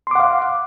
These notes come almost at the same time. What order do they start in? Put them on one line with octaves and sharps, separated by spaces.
C6 D6 F#5 F5